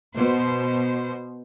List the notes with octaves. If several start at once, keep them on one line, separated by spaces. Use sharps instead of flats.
B2 C5